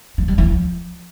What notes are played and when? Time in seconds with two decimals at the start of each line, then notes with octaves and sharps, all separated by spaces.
0.18 F3
0.28 G3
0.38 E3
0.48 F3